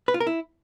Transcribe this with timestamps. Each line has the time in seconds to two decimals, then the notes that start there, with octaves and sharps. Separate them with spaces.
0.08 B4
0.14 F4
0.20 A#4
0.27 E4